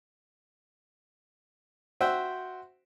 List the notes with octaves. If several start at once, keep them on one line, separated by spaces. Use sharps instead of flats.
F#4 C5 E5 F#5 G5